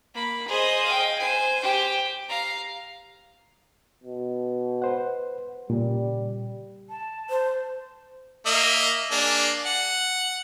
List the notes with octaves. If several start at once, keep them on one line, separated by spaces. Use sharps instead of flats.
A#3 B5
G#4 C5 D#5
F5 G5
C5 G#5
G4 G5
F5 A#5
B2
B4 C5 F#5
A#2 C#3 G3
A5
C5
A#3 D#5 E5
A#3 D4 G#4
F#5